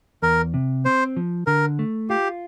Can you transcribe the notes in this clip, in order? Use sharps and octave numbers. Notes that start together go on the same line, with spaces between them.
E2 A#4
C3
C4 C5
F3
D3 A#4
A3
F4 G4